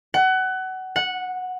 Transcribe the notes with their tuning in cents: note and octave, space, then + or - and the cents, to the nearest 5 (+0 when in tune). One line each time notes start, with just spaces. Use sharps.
F#5 +25
F#5 -10